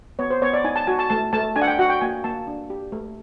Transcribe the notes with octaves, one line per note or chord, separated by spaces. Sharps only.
B3 C#5
C5
B3 C#5
D5
D#4 G#5
A5
F#4 G#5
A5
A3 A5
A3 A5
D4 G#5
F#5
G5
F#4 F#5
G5
A#3 G#5
A#3 A5
D4
G4
A3